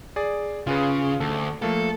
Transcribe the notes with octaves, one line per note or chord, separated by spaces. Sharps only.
G#4 D5
C#3 F4 G#4 B4
D2 A4
F3 A3 A#3 A4